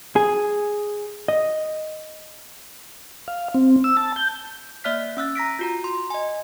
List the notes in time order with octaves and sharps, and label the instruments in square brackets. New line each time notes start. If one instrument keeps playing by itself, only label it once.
[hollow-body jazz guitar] G#4
D#5
[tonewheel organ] F5
C4
E6
A5
G6
[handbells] A#3 D5 E5 F6 F#6 B6
C#4 E6 F#6 A6
A#5 A#6 B6 D7
F4 F#4 A#5
C6
D#5 G#5